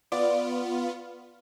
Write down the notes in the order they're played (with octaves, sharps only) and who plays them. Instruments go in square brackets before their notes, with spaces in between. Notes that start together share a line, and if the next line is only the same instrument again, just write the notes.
[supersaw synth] B3 F4 [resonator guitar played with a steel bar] D5